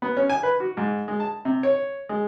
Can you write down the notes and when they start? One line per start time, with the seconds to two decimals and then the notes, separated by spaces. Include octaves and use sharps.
0.02 B3
0.17 C#4
0.30 G#5
0.43 B4
0.60 F#4
0.77 G#2
1.08 G#3
1.20 A5
1.45 C3
1.63 C#5
2.09 G#3